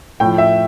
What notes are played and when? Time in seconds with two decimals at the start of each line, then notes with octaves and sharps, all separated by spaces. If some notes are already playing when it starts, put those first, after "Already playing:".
0.20 A2 F3 G5
0.38 E5